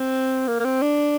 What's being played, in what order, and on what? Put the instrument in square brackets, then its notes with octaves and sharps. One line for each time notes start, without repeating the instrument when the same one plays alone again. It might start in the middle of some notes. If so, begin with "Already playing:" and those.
Already playing: [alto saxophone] C4
A#3
A#3
C4
D4